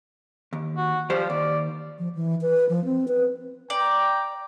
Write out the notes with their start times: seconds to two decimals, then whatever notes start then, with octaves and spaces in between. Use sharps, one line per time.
0.53 D#2
0.77 F#4
1.10 F3 G3 G4 C5
1.30 D#2 D5
1.99 F3
2.15 E3
2.41 B4
2.69 F3
2.85 C4
3.08 B4
3.70 D5 G5 A#5